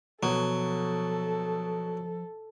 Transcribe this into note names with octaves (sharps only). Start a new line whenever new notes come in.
B2 F3 F#3 A4